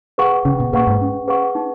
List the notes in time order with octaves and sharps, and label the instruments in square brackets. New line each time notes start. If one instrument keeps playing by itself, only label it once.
[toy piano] G#4 B4 F#5 C#6
[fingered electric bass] C#3 [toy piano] C#4
[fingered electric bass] B2
[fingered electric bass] A#2 [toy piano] G#4 B4 F#5 C#6
[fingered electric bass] G#2
[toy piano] C#4
G#4 B4 F#5 C#6
D#4